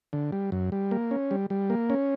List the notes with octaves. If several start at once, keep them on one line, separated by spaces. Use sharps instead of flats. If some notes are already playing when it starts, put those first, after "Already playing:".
D3
G3
F#2
G3
A#3
C#4
G3
G3
A#3
C#4